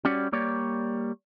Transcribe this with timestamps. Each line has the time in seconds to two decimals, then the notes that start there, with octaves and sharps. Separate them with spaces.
0.05 G3 C#4 F#4 D5
0.33 G3 A#3 C#5 D5